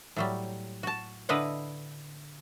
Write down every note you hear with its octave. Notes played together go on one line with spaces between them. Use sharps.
A2 F#3 G3
F#4 A5
D3 E4 B4 D#5 F5 F#5